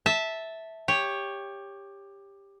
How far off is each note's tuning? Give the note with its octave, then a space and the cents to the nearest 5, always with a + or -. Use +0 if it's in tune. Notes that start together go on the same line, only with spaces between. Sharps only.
E5 -10 A5 +0
G4 +15 C#5 +0